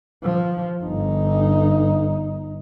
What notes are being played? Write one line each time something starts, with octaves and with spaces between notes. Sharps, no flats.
F3
G1 D#4